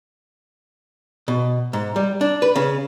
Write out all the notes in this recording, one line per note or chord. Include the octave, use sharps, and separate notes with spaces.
B2
G#2
G3
D4
B4
C#3